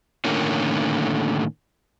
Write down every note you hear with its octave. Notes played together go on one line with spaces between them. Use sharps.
A2 D3 D#3 A#3 C#4